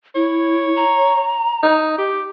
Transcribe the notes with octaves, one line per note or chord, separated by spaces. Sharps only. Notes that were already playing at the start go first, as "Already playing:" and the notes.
E4 C#5
A#5
D#4
G4